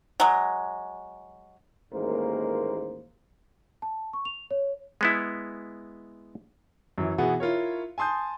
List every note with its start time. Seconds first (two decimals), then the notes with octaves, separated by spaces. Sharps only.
0.20 F#3 G#3
1.93 A1 D#2 G#3 A#3 A#4 C5
3.82 A5
4.13 C#6
4.25 F7
4.51 C#5
5.01 G#3 B3 E4
6.98 F#2 E3
7.18 B2 E3 B3 F#4 G#4
7.40 E4 F4 A#4 C#5
7.98 G#5 A5 C6 D#6 G6